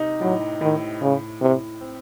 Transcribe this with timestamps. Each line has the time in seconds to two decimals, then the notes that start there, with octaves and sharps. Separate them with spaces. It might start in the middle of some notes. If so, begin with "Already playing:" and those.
Already playing: C3 D#4
0.21 A2 F#3
0.61 A2 D#3
1.02 A2 C#3
1.41 A2 C3
1.81 C4